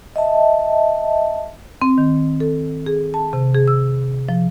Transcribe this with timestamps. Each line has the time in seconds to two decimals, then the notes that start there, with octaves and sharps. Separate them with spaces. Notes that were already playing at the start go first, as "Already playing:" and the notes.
0.16 D#5 E5 A5
1.81 C4
1.98 D#3
2.40 A4
2.86 G#4
3.14 A5
3.33 C3
3.54 G#4
3.68 E6
4.29 F3